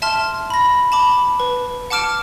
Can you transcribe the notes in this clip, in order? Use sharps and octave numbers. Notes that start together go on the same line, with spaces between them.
E5 A5 C6 F6
B5 A#6
A5 B5 D6
B4
F#5 A5 D6 F6 D7 E7